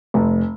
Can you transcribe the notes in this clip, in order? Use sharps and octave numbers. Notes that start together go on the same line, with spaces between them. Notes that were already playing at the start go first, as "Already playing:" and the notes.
F1